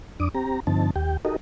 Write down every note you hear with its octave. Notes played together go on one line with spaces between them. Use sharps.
F2 D4 D6 D#6
C4 G4 A#5
G2 D3 F3 C4 D#4 A5
D#2 G4 G5
D#4 F#4 G4 A4 A#4 D#5